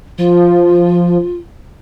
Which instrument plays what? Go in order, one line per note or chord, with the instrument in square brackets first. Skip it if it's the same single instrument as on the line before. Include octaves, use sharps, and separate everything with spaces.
[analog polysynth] F3 [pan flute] F4